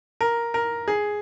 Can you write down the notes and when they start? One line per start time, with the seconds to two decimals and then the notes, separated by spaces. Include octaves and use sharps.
0.21 A#4
0.54 A#4
0.88 G#4